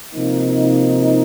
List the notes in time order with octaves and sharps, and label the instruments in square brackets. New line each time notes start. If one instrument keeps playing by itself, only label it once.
[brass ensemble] C3 F3 A#3 D#4